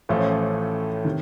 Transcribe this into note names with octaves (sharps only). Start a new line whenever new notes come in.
A1 A2 F3 A3 C#4
C3 D#3